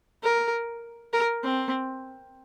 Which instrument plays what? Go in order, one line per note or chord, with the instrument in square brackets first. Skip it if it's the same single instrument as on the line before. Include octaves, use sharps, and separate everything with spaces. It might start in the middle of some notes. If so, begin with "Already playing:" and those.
[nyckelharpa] A#4
A#4
C4